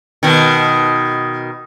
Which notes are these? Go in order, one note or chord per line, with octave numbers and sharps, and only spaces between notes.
B2 D#3